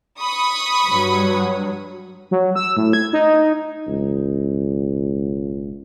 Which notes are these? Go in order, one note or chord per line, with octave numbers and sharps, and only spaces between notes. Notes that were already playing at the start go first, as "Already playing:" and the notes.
B5 C#6 D#6
G2 F#3
F#3
E6
A2
G#6
D#4
E1 C#2